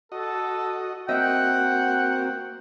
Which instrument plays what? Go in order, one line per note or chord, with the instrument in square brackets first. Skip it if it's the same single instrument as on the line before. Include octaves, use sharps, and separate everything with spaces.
[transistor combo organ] F#4 D#5 [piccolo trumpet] A4
[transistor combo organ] A#3 C4 F#4 [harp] D#5 E5 [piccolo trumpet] F#5 [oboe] G5